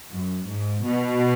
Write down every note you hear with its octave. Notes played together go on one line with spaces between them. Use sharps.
F#2
G#2
B2